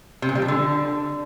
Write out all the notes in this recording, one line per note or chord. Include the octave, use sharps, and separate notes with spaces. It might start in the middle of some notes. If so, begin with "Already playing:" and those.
C3
A#2
G3
F3
D3